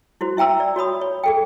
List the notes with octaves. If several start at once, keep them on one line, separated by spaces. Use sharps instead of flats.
E4 F#4 C5
E4 E5 G5 A#5 E6
D5
F#4 C#5 B5 D#6
C#5
G#4 A4 G5